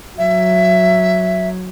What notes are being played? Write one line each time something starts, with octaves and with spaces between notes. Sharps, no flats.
F#3 E5